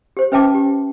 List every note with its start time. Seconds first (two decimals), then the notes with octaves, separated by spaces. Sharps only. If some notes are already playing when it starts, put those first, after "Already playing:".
0.17 G4 C5
0.32 C#4 B4 E5 G5 A5 D6
0.54 G4